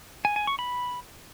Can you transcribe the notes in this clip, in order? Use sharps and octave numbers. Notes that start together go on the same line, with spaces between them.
G#5
G#5
C#6
B5